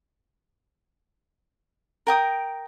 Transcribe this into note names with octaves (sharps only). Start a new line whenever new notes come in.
A#4 G5 D#6